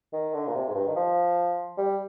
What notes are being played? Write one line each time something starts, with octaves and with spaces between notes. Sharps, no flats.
D#3
D3
A#2
C3
G#2
G2
D#3
F3
G3